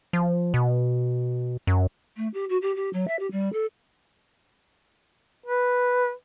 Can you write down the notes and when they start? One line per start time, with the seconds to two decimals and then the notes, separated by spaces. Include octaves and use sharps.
0.13 F3
0.54 B2
1.67 F#2
2.17 A3
2.34 G4
2.49 F#4
2.62 G4
2.76 G4
2.93 F#3
3.08 E5
3.19 G4
3.31 G3
3.53 A4
5.46 B4